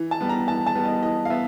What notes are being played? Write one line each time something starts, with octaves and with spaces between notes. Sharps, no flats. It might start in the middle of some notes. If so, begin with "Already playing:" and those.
Already playing: E3
A5
G3 B3
A#5
E3 A5
A5
G3 B3
D#5
E3 D#5
F5
B3 E5